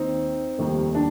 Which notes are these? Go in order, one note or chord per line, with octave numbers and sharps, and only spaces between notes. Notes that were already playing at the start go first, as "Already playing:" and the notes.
Already playing: D#2 D#3 C4 D#4
F1 D#2 D#3 G3
D4